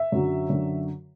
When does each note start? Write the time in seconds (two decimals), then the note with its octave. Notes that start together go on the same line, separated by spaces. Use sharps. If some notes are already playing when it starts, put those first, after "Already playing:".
Already playing: E5
0.12 F#2 D3 F#3
0.50 F#2 D3 F#3